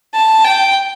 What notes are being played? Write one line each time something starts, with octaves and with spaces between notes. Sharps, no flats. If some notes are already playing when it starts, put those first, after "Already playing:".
A5
G5